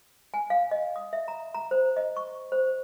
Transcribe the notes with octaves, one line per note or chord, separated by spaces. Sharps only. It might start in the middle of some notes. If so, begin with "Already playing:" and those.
G#5
F5
D#5
D#6
E5
A#5
A#5
C5
D#5
C#6
C5